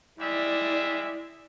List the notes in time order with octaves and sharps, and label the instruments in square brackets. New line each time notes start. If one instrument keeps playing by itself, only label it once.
[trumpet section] G3 G#3 E5 [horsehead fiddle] E4 D5